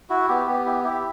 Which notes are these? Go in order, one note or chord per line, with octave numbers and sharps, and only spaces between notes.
E4 F#4
B3 G4
B3 G4
E4 G4
E4 G4